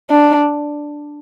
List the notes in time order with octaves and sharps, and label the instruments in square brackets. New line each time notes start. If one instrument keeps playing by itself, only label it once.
[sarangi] D4